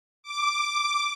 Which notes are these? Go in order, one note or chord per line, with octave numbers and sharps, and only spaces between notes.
D6